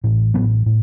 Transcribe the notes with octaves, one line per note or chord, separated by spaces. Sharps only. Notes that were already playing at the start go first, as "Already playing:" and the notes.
A1 A2
A1 A2 F#3 B3
A2